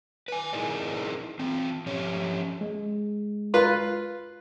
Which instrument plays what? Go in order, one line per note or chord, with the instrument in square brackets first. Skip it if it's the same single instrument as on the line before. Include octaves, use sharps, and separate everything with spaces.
[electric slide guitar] B4 G#5
D#4 E4 G#4 A#4 D5 D#5
E3 C4
F3 C#4 G4 C#5
[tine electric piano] G#3
[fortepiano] F4 B4